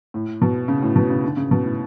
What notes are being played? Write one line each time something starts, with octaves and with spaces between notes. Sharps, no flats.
A2
B2
C#3
A2
B2
C#3
D3
C#3
B2
A2